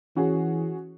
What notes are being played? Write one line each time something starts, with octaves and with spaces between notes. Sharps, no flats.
E3 C#4 F#4 G#4